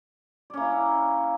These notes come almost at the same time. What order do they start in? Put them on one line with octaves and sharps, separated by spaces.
D5 C#4 A#3 E4